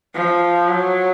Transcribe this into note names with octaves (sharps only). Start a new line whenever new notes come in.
F3
F#3